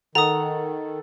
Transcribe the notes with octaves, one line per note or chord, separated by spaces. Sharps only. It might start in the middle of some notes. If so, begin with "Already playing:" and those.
D#3 A4 F#5 A#5 D#6